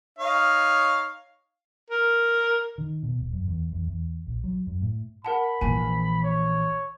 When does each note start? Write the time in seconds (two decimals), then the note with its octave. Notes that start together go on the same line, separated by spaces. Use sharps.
0.19 D#4 C#5 F5
1.90 A#4
2.78 D#3
3.03 B2
3.19 D#1
3.33 F#2
3.48 E2
3.72 E2
3.89 E2
4.27 A#1
4.44 F#3
4.67 F#2
4.82 A2
5.25 A#4 F#5 A5 B5
5.61 A#1 E3 G#5
6.23 C#5